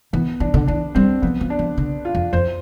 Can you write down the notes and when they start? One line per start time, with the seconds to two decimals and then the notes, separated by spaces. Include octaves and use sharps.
0.13 E3 B3
0.40 E3 D4
0.54 D3
0.68 E3 D4
0.95 G3 C4
1.22 F3 B3
1.41 F3
1.50 D4
1.59 F3
1.78 D3
2.05 F4
2.15 F2
2.33 F2 C5